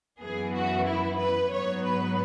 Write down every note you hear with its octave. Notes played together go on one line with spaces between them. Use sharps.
F#2 E3 B3 G#4
F#4
E4
B4
G#2 F#3 B3 C#5
B4